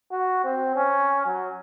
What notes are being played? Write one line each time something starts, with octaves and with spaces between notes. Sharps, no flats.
F#4
C4
C#4
F#3